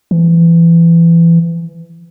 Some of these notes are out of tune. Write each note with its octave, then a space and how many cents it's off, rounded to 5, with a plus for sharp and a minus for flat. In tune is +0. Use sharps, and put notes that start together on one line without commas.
E3 +25